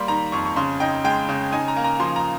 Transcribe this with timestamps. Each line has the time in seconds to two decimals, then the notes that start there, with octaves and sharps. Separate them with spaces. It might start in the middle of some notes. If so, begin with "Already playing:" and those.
Already playing: G3 A#3 C6
0.08 D#3 A#5
0.32 F2 C#6
0.45 C#6
0.56 C#3 C6
0.80 D#4 G5
1.04 G#3 G5
1.29 C#3
1.52 D#4 G#5
1.68 A#5
1.76 A#3
1.84 A#5
2.00 F3 C6
2.16 A#5